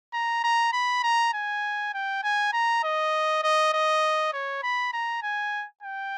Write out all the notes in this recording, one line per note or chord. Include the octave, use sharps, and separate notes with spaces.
A#5
A#5
B5
A#5
G#5
G5
G#5
A#5
D#5
D#5
D#5
C#5
B5
A#5
G#5
G5